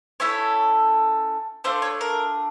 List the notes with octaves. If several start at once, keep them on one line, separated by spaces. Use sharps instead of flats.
A3 C#4 E4 A4 C#5
A3 D4 F4 C5
C#5
A#4